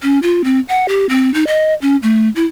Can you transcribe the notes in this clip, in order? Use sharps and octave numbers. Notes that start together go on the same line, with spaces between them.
C#4
F4
C4
F#5
G4
C4
D#4
D#5
C#4
A3
E4